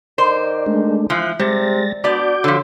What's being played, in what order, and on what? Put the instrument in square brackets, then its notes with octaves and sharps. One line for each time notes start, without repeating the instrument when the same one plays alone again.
[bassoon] D#3 [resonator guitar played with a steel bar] C5 [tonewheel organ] D5
[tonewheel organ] G#3 A3 D4
[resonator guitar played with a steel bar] E3 F3 [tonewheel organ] F#6
[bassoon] C3 [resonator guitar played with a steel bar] G3 [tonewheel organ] G#3 A6 A#6
[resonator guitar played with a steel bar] B3 D5 [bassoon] D4 [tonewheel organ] F#4 D6 G6
[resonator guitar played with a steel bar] D3 F3 [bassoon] F#3